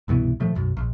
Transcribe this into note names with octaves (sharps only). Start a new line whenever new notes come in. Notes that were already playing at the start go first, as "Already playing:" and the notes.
C2 G2 B2 E3
A#2 D#3 F3 A3
B1 F#2
A#1